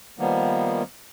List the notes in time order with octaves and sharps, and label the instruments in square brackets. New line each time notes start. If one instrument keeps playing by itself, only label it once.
[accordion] D#3 F3 G3 A#3 B3